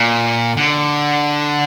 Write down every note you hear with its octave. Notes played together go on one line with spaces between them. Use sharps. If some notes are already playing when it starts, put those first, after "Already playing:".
Already playing: A#2
D3